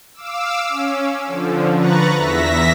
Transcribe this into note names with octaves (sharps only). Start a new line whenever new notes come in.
F5 D6 E6
C#4
D3 F3
B4 A#5 C#6 F#6 A6
E2 E5 A#6 B6